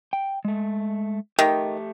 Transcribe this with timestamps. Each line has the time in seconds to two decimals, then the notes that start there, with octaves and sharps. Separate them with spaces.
0.13 G5
0.45 G#3 A3
1.39 D#3 A3 G4